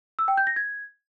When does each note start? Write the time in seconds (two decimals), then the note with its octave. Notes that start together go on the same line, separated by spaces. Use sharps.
0.19 E6
0.28 G5
0.37 G6
0.47 A#6
0.56 G#6